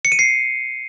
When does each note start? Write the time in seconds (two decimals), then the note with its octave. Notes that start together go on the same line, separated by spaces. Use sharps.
0.05 C#7
0.12 D#7
0.19 C7